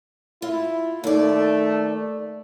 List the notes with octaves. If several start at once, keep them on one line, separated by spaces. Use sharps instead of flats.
E4 F4
D#2 A3 D5